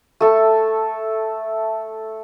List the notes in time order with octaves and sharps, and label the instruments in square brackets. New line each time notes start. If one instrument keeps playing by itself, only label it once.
[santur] A3 A4